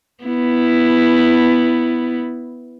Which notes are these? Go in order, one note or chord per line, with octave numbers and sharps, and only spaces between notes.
B3 E4